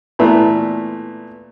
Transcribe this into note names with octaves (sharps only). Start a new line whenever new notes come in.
A#2 E3 A3 B3